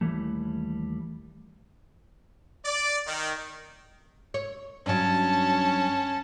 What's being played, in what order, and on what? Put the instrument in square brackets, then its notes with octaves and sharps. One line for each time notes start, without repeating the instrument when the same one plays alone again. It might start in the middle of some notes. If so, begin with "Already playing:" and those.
[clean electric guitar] D#2 E3 G3 A3
[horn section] D5
D#3
[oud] C#5
[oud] G2 F#3 [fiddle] C#4 A5